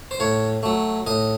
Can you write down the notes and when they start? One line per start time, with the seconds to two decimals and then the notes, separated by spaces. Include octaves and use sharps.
0.11 C5
0.20 A2 C#5
0.63 F#3 A3
1.07 A2 D#5